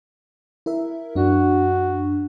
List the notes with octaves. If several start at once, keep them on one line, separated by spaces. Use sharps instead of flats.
E4 A#4 E5
F#2 D4 F#4